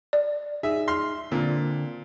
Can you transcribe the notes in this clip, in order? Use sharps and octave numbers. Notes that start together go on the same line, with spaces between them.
D5
D#4 G#4 E5
C6 F6
A#2 D3 C4 D4